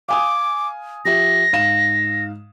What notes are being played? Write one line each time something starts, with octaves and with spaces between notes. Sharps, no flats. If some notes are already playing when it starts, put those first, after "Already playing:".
F5 G#5 D6 D#6
F3 G4 E5 A#6
G#2 F5 E7